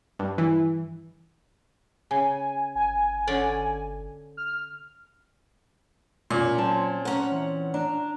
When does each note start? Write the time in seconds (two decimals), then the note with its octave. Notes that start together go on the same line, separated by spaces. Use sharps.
0.19 G2
0.38 E3
2.11 C#3 G#5
2.75 G1 G#5
3.27 D3 C#4 D5
4.37 F6
6.30 A#2 C#4 F4
6.58 F#3 C4 A5
7.05 C#4 F#5 A#5
7.31 E3
7.74 D4 A#5